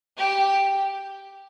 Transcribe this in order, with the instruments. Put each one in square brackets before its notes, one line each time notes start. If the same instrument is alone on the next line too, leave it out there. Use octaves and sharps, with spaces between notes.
[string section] G4